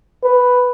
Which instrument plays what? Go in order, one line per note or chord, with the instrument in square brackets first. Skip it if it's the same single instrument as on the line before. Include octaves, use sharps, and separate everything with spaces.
[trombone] B4